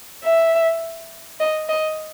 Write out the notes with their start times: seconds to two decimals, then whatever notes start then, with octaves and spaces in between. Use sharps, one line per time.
0.24 E5
1.40 D#5
1.69 D#5